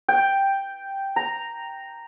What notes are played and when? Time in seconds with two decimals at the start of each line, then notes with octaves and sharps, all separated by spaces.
0.08 G5
1.16 A#5